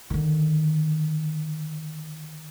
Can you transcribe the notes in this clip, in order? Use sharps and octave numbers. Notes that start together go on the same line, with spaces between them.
D3 D#3